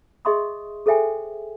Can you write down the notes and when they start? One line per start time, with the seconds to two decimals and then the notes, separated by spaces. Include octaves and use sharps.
0.25 G#4 D#5 E5 C6 C#6 D#6
0.86 G#4 A4 C5 E5 G5 G#5